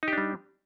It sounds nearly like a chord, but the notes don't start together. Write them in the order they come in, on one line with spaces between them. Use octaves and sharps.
D#4 G4 D4 G3